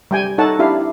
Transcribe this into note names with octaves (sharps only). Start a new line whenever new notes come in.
G3 G5 G#5
D#4 A4 C#5 F#5 A5
D4 E4 G4 F5